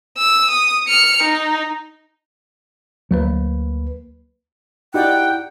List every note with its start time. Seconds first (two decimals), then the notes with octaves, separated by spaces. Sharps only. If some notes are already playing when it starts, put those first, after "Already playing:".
0.18 E6
0.51 D#6
0.88 F6 C#7
1.23 D#4
3.11 D2 F#3 A#3 B4
4.94 D#4 E4 F#4 G4 D5 F#5 G5